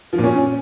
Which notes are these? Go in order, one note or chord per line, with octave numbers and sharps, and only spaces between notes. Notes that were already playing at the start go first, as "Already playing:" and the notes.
F3
A#2
C#4